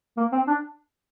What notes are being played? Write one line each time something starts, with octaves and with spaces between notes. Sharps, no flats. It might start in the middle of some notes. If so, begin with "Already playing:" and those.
A#3
C4
D4